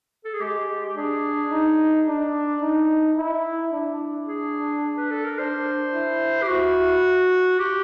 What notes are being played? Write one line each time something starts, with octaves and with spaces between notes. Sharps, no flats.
A4
G#4
G#3 G4
G4
D4 G#4
D#4
D4
D#4
E4
D4
G#4
B4
A4
A#4
D4 C5
E4
G4
E4 F#4
G4